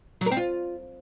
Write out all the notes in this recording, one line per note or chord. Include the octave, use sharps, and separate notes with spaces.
F#3
A#4
C4
F4